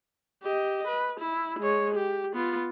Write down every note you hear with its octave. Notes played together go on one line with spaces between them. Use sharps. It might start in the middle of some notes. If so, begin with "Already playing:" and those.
G4 D#5
B4
E4
G#3 C#5
G4
B3 F4